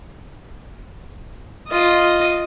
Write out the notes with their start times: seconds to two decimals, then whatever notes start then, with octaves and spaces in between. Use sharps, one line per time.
1.68 F4 D#5